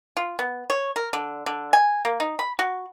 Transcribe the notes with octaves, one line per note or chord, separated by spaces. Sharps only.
F4
B3
C#5
A#4
D3
D3
G#5
A#3
D#4
B5
F#4